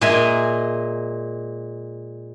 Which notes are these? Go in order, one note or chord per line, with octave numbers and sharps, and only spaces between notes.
A#2 G#3 E5 G#5 A#5